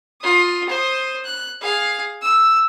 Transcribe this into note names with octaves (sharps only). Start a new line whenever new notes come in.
F4 D#6
C5 D#6
F#6
G#4 F5
E6